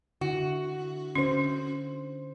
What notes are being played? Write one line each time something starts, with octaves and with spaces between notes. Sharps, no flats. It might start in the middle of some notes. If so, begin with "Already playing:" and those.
D3 E4 F#4
D3 C#4 C5